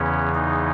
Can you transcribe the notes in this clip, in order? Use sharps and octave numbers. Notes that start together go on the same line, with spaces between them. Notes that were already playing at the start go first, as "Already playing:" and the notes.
Already playing: E2 C#3 E3 C#4
D#4